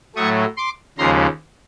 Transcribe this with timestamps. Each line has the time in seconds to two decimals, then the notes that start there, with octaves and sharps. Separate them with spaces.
0.16 A2 F#3 A3 C#6 D#6
0.57 C6 D6
0.98 D#2 C#3 F3 G#3 A#5 C6